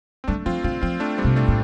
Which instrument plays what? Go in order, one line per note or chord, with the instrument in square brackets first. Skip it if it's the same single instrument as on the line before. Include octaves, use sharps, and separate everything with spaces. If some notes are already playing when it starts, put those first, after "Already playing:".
[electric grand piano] C4
[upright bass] G3 [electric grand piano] A3 D4
[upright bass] F3 [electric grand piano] C4 F4
[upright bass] D3 [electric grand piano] C4 F4
[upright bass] F3 [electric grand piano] C4 F4
[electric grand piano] A3 D4
G3 C4
[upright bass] C3
[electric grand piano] A3 D4
[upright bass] A2